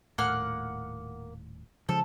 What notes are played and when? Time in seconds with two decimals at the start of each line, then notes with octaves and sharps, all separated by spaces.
0.18 D#1 A2 A#3 F#5 F6
1.89 C#3 F3 G#3 A4